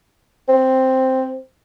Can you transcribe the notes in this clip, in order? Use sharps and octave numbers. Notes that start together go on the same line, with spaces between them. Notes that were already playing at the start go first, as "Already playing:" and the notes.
C4